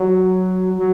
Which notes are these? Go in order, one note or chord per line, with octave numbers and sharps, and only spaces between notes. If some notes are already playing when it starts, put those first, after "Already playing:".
Already playing: F#3
F#3